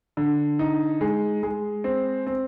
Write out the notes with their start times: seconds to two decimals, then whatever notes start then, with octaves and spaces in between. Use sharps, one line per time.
0.17 D3
0.59 D#4
1.01 G#3
1.43 G#3
1.84 C4
2.26 C4